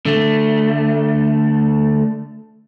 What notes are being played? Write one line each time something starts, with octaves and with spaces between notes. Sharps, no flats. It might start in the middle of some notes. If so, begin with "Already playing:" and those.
D3 A3